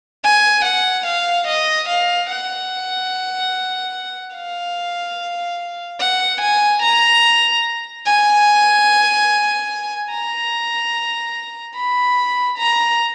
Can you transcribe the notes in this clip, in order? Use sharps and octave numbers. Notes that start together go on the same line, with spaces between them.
G#5
F#5
F5
D#5
F5
F#5
F5
F#5
G#5
A#5
G#5
A#5
B5
A#5